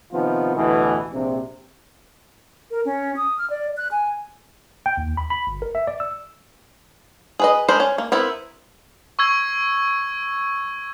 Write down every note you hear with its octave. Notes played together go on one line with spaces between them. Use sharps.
C3 D#3 F3 B3 F4
A1 D2 B2 E3
A#1 C3
A#4
C#4
D#6
F6
D5
F#6
G#5
G5
D#2
B5
B5
G1
A#4
E5
D5
E6
G#4 B4 D#5
G#3 D4 A#4 C5 B5
C#4
A#3
B3 C4 E4 A#4
C#6 E6 G#6